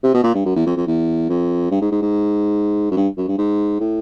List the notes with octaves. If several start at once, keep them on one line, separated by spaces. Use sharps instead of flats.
C3
B2
A#2
G2
F#2
E2
F2
F2
E2
F2
G2
G#2
G#2
G#2
F#2
G2
F#2
G2
G#2
A2